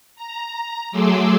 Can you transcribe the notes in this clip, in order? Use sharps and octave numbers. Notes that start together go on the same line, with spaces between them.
A#5
F#3 A3 G#4 C6 D6 E6